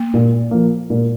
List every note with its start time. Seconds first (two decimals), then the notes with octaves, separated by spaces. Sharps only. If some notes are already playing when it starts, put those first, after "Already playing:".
Already playing: A#3
0.14 A#2
0.51 F3 A#3
0.90 A#2